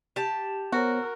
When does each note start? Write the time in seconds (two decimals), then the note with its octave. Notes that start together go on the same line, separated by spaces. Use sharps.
0.16 G4 A5
0.72 B3 F#4 A#4 C5 C#5